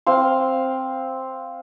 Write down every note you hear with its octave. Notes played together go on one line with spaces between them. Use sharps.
C4 F5 C6